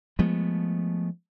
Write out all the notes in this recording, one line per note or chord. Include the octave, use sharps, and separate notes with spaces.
F3 G#3 A3 B3